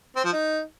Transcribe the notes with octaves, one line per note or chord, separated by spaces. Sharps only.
C4
F3
D#4